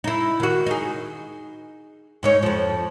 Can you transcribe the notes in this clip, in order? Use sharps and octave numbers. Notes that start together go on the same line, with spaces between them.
D#4 E4
D#3 F#4
D#4 G#4
G#2 D#4 C#5
F2 F3